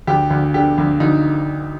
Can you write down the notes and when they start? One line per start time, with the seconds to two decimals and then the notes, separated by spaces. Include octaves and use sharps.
0.07 D2 G4
0.30 D2
0.54 D3 G4
0.78 D2
1.00 D2 D#4